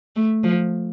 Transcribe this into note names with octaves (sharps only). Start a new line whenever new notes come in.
A3
F3